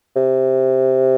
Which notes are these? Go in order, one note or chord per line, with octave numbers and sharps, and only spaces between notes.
C3